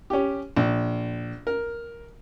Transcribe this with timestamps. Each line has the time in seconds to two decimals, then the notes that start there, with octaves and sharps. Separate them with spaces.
0.10 C#4 G4
0.56 A#1
1.47 A#4